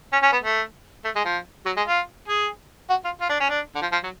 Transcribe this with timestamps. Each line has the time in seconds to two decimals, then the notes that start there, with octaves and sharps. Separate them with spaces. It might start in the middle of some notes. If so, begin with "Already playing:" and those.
0.13 C#4
0.23 C#4
0.32 B3
0.43 A3
1.05 A3
1.16 G#3
1.25 F3
1.66 F#3
1.77 G#3
1.88 F4
2.28 G#4
2.90 F#4
3.05 F4
3.21 F4
3.30 D4
3.40 C#4
3.49 D4
3.75 D3
3.82 F3
3.92 F3
4.04 F#3